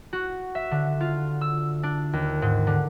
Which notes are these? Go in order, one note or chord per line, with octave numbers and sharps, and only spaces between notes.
F#4
E5
D3
F4
E6
D4
D#2
G#2
D3